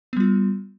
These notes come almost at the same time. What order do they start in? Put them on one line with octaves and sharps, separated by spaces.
B3 G3 F4